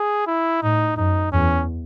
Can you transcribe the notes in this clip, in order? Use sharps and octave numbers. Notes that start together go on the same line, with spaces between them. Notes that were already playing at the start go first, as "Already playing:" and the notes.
Already playing: G#4
E4
A2 D#4
F#2 D#4
E2 C#4